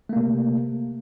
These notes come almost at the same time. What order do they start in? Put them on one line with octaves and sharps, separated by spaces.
A3 A#3 C3